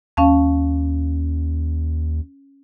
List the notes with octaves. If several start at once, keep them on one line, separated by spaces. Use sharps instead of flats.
D#2 C#4 F5 A5